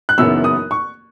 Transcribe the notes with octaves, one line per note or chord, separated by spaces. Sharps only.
F#6
F#1 F#2 E3 B3 D#4 E6
D#6
C#6